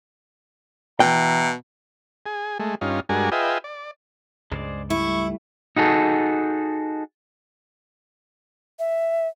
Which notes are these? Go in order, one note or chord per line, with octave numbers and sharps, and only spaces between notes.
B2 E3 E5 G5 A#5
G#4
G#3 A3
G2 C#4 D#4 F4
G2 G#3 D4 F#4 A#4 G#5
F4 G#4 B4 D#5 E5 G5
D5
C#2 G2 G#3 C5 D5
G3 A3 E4 C#6
D#4 F#4 G#4 A4
E5